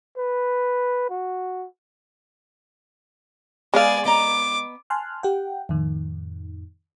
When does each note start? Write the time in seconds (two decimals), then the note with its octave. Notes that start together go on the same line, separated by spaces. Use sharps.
0.17 B4
1.10 F#4
3.74 G#3 B3 G#4 D5 F5 G#5
4.05 B3 D#5 A#5 D6
4.90 G#5 A5 C6 F6 F#6
5.23 G4 F#5 G5
5.69 F2 A2 D#3